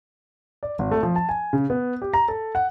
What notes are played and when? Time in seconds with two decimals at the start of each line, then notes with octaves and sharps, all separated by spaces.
0.63 D5
0.79 G#1
0.91 A3
1.03 F3
1.16 A5
1.29 G#5
1.53 C#3
1.70 B3
2.02 G4
2.14 A#5
2.28 A4
2.55 F#5